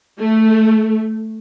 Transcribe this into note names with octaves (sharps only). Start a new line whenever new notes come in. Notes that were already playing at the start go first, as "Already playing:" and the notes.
A3